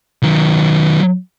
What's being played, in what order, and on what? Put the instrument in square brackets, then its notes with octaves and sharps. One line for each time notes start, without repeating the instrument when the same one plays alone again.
[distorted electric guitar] D#3 F#3